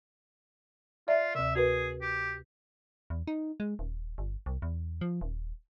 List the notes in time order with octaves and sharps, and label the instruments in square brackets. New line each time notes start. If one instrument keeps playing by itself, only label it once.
[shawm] F4 [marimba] D5 E5
[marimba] D2 C3 [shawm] E5
[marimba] F#4 A#4 B4 [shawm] G#4
[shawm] G4
[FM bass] E2
D#4
G#3
D#1
G1
C2
E2
F3
D#1